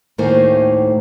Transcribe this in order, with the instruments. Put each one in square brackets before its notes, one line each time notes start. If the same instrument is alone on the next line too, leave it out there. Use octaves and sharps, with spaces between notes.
[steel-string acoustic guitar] D2 A2 D#3 A#3 C5 G#5